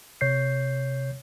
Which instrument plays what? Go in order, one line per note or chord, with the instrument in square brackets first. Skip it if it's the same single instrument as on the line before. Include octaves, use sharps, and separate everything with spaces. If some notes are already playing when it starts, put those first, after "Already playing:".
[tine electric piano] C3 C#5 G6 C7